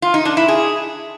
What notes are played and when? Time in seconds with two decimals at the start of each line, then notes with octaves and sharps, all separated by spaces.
0.02 F4
0.14 D#4
0.25 D4
0.37 E4
0.48 G#4